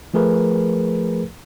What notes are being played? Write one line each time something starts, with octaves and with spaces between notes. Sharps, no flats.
F3 A3 G#4 A#4 B4